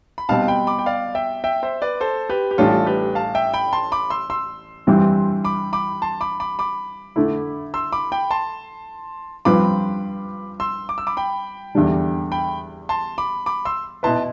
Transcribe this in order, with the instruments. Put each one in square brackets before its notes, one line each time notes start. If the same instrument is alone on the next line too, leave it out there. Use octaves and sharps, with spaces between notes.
[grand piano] B5
[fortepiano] B2 G3 C4 [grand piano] F5 A5
[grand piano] G5 B5
B5 D6
G5
D5 F5
E5 G5
E5 G5
C5 E5
B4 D5
A4 C5
G4 B4
G4
[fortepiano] A1 A2 G3 D4 [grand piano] F4 A4
[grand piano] G4 B4
F5 A5
E5 G5
G5 B5
A5 C6
B5 D6
C6 E6
C6 E6
[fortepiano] G2 E3 G3 C4
[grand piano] B5 D6
B5 D6
A5 C6
B5 D6
B5 D6
B5 D6
[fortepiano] D3 A3 E4
[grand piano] C6 E6
B5 D6
G5 B5
A5 C6
[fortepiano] G2 F3 C4 F4 B4 [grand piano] B5 D6
[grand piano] C6 E6
D6
E6
B5 D6
G5 B5
[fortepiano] E2 D3 G3 D4
[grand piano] G5 B5
A5 C6
B5 D6
B5 D6
C6 E6
[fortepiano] B2 B3 E4 B4 [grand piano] A5 C6